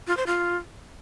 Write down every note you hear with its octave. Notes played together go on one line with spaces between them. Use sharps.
F4
C5
F4